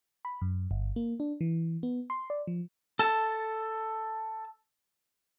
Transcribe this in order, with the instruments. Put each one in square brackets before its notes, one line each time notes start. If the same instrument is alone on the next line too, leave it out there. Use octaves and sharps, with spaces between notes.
[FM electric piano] B5
F#2
G1
A#3
D4
E3
B3
C6
D5
F3
[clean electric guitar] A4 A5